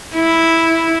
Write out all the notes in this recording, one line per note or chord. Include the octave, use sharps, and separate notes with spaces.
E4